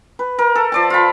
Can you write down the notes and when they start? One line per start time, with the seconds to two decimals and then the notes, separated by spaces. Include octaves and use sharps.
0.19 B4
0.39 A#4
0.55 A4
0.72 F3 D5 A5
0.90 F4 B5